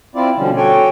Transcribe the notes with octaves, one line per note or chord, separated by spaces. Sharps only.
C4 E4 F4 D5
B2 D3 F3 G3 C#4
F#4 G4 A4 C#5 G5 G#5